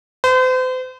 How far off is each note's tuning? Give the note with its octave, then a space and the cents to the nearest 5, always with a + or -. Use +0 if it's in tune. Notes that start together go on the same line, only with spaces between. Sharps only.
C5 -40